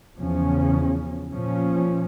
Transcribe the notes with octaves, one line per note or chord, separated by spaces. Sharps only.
E2 C#3 F3 C#4
A#2 F3 C#4